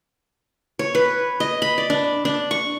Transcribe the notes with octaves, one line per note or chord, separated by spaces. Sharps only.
C#5
B4
D#5
B5
D5
D4
D4
C#6